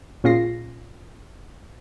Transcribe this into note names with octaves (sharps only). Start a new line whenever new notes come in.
A#2 C#4 F4 G#4 A#6 C7